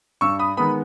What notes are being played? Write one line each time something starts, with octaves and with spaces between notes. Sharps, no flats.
G2 C#6 E6
B5 D#6
D#3 G#3 B3 B5 D#6